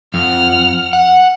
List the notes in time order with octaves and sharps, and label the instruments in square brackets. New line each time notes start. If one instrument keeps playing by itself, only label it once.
[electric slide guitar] F2 [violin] F#5 F6
[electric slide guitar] F#5